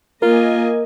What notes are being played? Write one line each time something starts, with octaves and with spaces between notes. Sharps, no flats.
A#3 F4 A#4 D#5 G#5